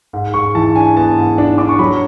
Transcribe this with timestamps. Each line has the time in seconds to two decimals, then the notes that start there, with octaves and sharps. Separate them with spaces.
0.13 G#2
0.34 G#2 C#6
0.55 E3 A5
0.76 D4 G#5
0.97 B3 A5
1.18 G#2
1.38 D4
1.58 D4 D6
1.69 C#6
1.79 F#3 B5